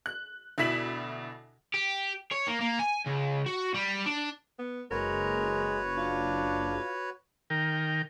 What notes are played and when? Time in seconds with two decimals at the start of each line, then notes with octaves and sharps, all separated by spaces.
0.06 F#6
0.58 D2 B2 E4 B6 E7 F#7
1.74 G4
2.31 C#5
2.47 A#3
2.61 A#3
2.79 G#5
3.07 C#2
3.46 F#4
3.74 G3
4.06 D4
4.59 B3
4.91 F#1 G#3 F#4 A#4 B4 C#5
5.97 D4 F4
7.50 D#3 A#4 G5